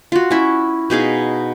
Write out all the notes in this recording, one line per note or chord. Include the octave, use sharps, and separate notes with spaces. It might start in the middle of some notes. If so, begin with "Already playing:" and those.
F4 F#4
C#4 E4
B2 D#4 G#4 F5